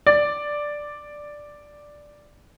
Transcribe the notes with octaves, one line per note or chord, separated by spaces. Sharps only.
D5